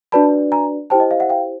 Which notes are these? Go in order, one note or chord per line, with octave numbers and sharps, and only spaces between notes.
D4 F#4 B4 D5 A5 B5
G#5 A#5
E4 G4 C5 G5 A5
D#5
D#5 F5
E5 F#5
F5 G5